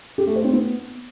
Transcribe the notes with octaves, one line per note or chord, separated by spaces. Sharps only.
G4
A3
C5
C4
B3